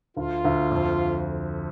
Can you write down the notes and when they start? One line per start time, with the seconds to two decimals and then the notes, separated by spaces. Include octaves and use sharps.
0.17 D2 F4
0.45 D2
0.71 F2